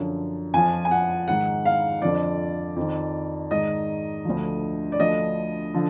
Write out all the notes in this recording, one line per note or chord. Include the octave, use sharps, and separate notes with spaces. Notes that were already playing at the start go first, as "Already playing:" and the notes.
Already playing: F#2 D3 F3
F2 F3 G#5
G#5
F#5
G#2 D#3 F#5
F5
F2 D3 F3 D5
F2 D#3
G#2 D#3 D#5
D2 D3 F3
D5
D2 D3 F3 D#5
D3 F3